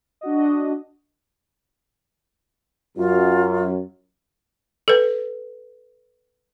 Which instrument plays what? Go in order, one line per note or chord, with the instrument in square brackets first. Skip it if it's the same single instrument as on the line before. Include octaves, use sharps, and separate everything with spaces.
[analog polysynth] D4 F#4 D#5
[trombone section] F#2 [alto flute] F4
[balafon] A4 B4